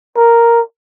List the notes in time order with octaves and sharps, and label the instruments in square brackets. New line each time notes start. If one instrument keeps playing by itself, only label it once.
[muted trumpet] A#4